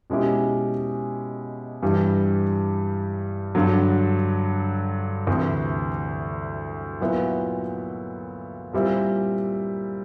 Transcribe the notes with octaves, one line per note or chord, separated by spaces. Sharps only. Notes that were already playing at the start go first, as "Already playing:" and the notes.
B2 G#3 C#4 E4 G4
G2 E3 G3
G2 D3 F#3
D2 C3 E3
A#2 F#3 B3 E4
A#2 G3 C4 E4